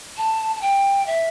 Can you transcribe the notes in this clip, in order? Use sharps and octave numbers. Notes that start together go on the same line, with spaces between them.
A5
A5
G5
E5